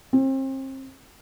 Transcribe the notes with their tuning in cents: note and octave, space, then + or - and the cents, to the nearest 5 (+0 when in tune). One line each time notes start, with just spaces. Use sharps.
C4 +35